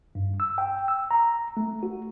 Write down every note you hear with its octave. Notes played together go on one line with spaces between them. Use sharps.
G2
E6
G5
E6
A#5
A3
F#4